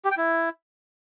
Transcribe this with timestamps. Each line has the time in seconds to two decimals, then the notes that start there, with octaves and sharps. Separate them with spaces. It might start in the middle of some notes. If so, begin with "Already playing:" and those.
0.05 G4
0.11 G5
0.17 E4